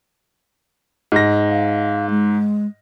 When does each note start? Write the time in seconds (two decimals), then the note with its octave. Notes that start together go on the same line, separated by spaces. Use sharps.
1.12 G#2 A#6
1.49 F5
2.10 G#3